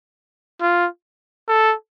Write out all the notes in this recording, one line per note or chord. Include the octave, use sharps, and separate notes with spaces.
F4
A4